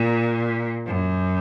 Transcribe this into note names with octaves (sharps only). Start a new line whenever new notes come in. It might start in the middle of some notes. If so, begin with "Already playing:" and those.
Already playing: A#2
F#2